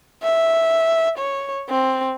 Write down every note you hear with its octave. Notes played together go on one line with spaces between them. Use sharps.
E5
C#5
C4